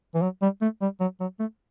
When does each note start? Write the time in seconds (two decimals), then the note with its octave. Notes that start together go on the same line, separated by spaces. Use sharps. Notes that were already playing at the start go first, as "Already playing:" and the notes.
0.15 E3
0.22 F#3
0.42 G3
0.62 A3
0.82 G3
1.00 F#3
1.20 F#3
1.40 A3